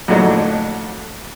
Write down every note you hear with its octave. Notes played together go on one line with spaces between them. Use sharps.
F2 A2 D3 F#3 D4 D#4